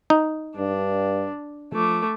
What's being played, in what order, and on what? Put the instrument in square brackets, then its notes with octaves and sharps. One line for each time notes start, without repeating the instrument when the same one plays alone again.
[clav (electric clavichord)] D#4
[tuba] G2 [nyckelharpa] D4
[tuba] F3 [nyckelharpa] A3 D6